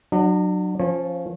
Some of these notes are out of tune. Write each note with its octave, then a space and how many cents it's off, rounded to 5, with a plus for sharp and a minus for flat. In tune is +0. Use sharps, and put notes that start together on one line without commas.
F#3 +0 D4 +40
F3 +0 C#4 +0 C#5 -35